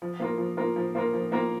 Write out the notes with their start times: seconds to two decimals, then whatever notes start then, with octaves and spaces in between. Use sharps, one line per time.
0.02 F3
0.20 A#3 F4 A#4
0.38 F3
0.57 A#3 F4 A#4
0.76 F3
0.95 A#3 F4 A#4
1.13 F3
1.32 A#3 F4 A#4